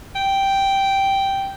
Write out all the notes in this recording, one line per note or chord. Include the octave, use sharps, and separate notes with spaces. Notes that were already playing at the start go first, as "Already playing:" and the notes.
G5